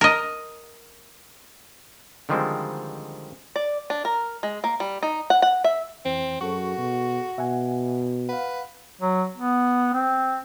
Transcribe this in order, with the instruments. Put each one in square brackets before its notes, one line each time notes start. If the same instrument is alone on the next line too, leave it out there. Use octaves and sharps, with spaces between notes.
[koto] A#4 D#5
[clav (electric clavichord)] D3 D#3 F3 G3 G#3 C4
[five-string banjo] D5
D4
A#4
G#3
A#3
G3
D#4
F#5
F#5
E5
[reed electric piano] F2 E3 [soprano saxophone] C4
[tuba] F#2 [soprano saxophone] F#4 [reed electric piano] G#4 A4 C#6
[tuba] B2
[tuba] B2 [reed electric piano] E5 F#5 G#5
[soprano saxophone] B4 [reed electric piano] F5 F#5
[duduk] F#3
B3
C4